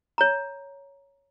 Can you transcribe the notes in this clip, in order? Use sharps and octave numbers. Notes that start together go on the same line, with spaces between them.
C#5 A#5